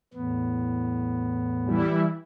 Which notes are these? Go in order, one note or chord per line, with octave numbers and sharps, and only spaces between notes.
E2 A2 B3
E3 G3 E4